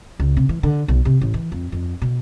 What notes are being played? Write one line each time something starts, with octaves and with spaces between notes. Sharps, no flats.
C#2
C3
E3
D3
B1
C3
A1
E3
F2
F2
B2